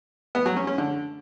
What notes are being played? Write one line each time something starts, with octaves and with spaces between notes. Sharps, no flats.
B3
F#3
C#4
C#4
D3